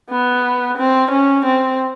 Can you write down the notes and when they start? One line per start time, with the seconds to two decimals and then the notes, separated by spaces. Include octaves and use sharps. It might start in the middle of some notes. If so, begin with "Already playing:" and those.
0.10 B3
0.77 C4
1.11 C#4
1.45 C4